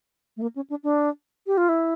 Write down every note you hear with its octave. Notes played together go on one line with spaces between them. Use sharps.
A3
A#3
C#4
D4
D4
G4
F4
E4